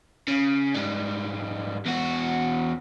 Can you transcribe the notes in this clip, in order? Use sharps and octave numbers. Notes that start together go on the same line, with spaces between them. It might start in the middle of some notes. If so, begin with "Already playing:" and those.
C#3
G#2 G3
E2 F#4